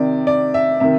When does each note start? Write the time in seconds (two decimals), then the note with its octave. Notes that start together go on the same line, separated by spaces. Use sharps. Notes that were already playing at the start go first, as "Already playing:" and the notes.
Already playing: C3 D#3 D5
0.27 D5
0.54 E5
0.80 C3 D#3 E5